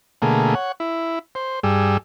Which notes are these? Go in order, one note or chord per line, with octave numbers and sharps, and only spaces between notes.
B2 D3 A3 A#3 G#4
C#5 F#5
E4
C5
G2 G3 G#4 E6